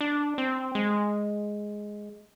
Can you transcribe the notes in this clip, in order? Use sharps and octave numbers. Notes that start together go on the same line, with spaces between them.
D4
C4
G#3